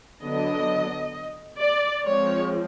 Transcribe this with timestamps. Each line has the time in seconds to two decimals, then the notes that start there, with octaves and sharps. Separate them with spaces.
0.24 D3 F#3 B3 D4 D#5
1.59 D5
2.04 F3 G#3 C4 C#5